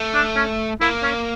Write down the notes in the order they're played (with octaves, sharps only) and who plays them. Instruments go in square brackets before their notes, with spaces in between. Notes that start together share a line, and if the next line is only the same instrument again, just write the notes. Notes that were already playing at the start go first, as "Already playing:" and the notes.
Already playing: [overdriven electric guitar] A3
[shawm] D4
C#4
[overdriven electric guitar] A#3 [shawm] E4
[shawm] C#4